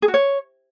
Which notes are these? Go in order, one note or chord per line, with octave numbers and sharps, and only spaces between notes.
G#4
F#4
C#5